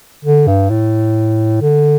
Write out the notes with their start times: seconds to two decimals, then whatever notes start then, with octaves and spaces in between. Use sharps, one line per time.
0.25 D3
0.47 G2
0.70 A2
1.61 D3